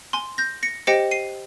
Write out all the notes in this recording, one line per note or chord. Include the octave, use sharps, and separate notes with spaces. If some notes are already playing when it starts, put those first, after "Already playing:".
G#5 C6
G6 A#6
A#6 C#7
G4 C5 D#5 G5 A#6 C#7
C7 D#7